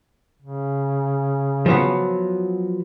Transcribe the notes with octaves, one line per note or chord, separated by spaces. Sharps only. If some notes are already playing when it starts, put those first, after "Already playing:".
C#3
F3 F#3 B3